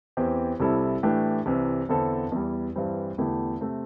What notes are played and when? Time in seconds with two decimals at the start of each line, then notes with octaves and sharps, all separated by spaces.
0.17 E2 E3 C4 G4
0.60 C2 C3 G3 E4 A4
1.03 A2 E3 A3 D4 G4
1.46 C2 C3 E3
1.89 E2 D3 C4 E4 A4
2.32 E2 E3 G3
2.76 G2 E3 G3 C4
3.18 E2 D3 A3 E4 G4
3.61 C3 A3 C4